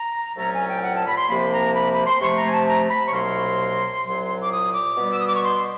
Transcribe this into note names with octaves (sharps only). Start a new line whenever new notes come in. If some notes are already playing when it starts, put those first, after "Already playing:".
Already playing: A#5
C2 A#2 F#3 A3 C#4 A#5
G#5
G5
F#5
A5
B5
C6
C2 C3 F3 A#3 B5
A#5
B5
B5
C6
C3 F3 A3 C#6
A#5
G#5
A5
A#5
A#5
B5
C#6
C2 B2 F#3 A#3 C6
C2 A#2 F#3
D6
D#6
D6
B2 G3 B3
E6
D#6
D6
C#6
C6